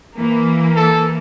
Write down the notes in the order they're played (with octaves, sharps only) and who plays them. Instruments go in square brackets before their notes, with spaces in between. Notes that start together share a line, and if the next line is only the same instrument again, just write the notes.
[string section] E3 A#3
[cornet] A4